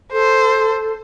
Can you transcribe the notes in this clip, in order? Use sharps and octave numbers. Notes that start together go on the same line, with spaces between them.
A4 C5